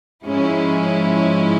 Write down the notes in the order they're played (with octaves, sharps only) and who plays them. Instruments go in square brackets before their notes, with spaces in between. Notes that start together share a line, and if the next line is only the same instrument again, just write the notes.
[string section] G#2 F3 G#3 C#4 E4